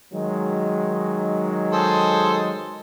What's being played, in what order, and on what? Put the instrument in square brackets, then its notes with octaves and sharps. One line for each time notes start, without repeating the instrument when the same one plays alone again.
[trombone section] D#3 F#3 G#3
[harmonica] G#4 A4 C5